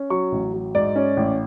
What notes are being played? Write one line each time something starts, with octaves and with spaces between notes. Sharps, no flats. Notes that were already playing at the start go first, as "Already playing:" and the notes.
Already playing: C#4
F#3 C#6
A1
F#3
G#2 D5
C#4
A1